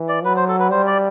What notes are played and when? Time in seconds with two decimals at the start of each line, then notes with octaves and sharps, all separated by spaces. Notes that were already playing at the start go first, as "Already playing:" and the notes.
Already playing: E3
0.09 D5
0.24 F#3 B4
0.36 C5
0.48 A4
0.59 B4
0.71 G3 C5
0.87 D5